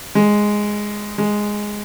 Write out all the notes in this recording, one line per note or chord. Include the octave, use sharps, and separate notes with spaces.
G#3
G#3